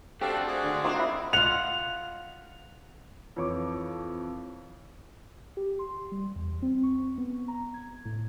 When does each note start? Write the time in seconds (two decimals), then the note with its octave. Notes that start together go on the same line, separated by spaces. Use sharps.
0.21 C4 D4 F#4 G4 A4 F5
0.47 G#4 D6
0.63 D3
0.84 D#3 C4 F4 A#4 D5
0.99 E4 D#5
1.33 F4 F#5 F7
3.36 F2 E3 C#5 C#6 D6
5.57 G4
5.79 C6
6.12 G3
6.36 E2
6.62 C4
6.83 C#6
7.18 B3
7.48 A#5
7.74 G#6
8.05 A2